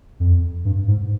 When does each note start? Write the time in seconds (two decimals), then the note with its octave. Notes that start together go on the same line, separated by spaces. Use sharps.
0.20 F2
0.65 G2
0.88 G#2